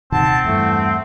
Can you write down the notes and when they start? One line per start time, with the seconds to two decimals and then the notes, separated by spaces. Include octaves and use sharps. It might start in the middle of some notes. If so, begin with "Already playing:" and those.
0.12 D#1 C3 D#3 C4 F#5 A5
0.44 E2 G2 E3 A3